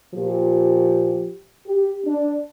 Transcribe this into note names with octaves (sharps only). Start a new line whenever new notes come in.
A#2 F3 G4
G4
D4